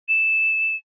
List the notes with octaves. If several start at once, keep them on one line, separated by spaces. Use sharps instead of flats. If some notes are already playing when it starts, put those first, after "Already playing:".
E7